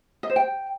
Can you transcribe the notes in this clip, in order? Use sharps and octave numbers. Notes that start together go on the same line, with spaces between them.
D#5
C5
G5